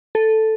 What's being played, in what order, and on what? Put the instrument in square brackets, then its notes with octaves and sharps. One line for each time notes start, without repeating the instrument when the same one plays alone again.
[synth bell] A4